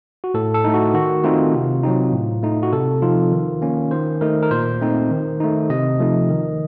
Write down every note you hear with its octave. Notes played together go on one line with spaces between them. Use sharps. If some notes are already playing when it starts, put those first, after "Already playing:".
F#4
A2 A4
A4
A3 D#4
F#4
D#3 F#4
A3 C4 D#4 F4
C3
F#3 C4 D#4
A2
A3 D#4
F#4
C3 A4
F3 C4 D#4 F4
D#3
A#3 C#4
D#3 C5
A3 D#4 A#4
A#4
A#2 C5
A3 C4 D#4
D#3
A3 D#4
C3 D#5
F3 A3 D#4
D#3